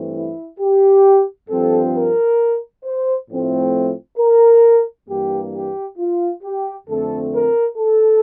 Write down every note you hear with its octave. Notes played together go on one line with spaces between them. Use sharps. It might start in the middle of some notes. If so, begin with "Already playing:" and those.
Already playing: G2 E3 A3 C4
E4
G4
G2 F3 C4 A4
A#4
C5
A2 F3 A3 C4
A#4
G2 E3 A#3 G4
G4
F4
G4
F2 D3 A3 C4 A4
A#4
A4